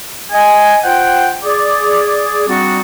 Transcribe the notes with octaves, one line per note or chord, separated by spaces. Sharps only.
D#5 G#5
F4 C5 F#5 G5
G#4 D5
G3 C4 D4 D#4 F#4